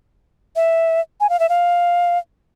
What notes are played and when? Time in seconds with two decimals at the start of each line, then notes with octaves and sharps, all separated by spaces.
0.56 E5
1.21 G#5
1.30 F5
1.40 E5
1.49 F5